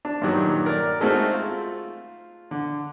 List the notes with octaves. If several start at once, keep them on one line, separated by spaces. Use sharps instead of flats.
D4
G2 A#2 D#3 F#3 G3
A#4 D5
G#3 A3 C4 D#4 F#4 F6
F4
D3